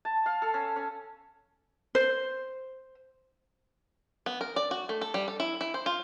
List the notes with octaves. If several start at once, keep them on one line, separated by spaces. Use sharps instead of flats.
A5
F5
A4
C#4
C#4
C5
B3
A#4
D5
F#4
A3
A4
G3
A4
E4
E4
C5
F4